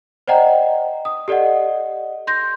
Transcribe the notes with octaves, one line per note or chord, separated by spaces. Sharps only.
C5 D5 D#5 F#5 G5 A#5
D#6
G4 A4 D5 D#5 F#5
C6 G6 A#6